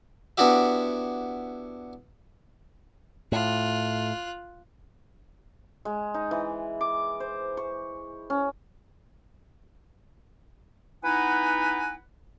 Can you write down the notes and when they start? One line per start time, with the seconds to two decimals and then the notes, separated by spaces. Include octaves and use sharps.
0.37 B3 D4 E4 F#4 G4 E5
3.32 A2 F4 F#6
5.85 G#3
6.14 D#4
6.31 E3
6.81 D6
7.20 C5
7.57 C#6
8.30 C#4
11.03 B3 D#4 E4 B4 F#5 G#5